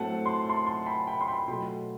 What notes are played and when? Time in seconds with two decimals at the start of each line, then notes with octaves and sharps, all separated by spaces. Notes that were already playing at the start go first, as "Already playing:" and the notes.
Already playing: A2 F#3 A3 C4 F#5 A5
0.26 C6
0.50 A5 C6
0.66 A5 C6
0.83 A5
0.86 G5 B5
1.07 G5 B5
1.21 C6
1.27 G5 B5
1.48 B2 F#3 A3 G5 B5